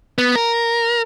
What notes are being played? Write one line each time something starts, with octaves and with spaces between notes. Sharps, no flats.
B3
A#4